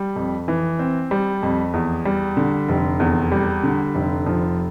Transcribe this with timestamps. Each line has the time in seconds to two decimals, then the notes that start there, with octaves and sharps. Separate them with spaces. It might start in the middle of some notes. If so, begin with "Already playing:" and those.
Already playing: G3
0.16 F2
0.48 E3
0.79 C4
1.11 G3
1.43 F2
1.74 E2
2.05 G3
2.37 D3
2.69 F1
3.00 E2
3.32 G3
3.63 D3
3.95 F1
4.26 F3